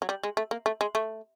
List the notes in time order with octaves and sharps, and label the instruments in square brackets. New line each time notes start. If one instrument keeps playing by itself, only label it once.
[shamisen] F#3
G3
G#3
A3
A#3
A3
G#3
A3